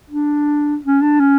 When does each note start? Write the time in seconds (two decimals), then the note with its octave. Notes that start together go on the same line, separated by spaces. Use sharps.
0.10 D4
0.84 C#4
1.02 D4
1.20 C#4